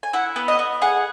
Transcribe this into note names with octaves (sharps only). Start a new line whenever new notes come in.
G#5
E4 F#5
B3
D#5
B3
G#4 F#5